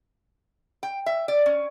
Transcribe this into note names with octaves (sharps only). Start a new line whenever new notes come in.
G5
E5
D5
C#4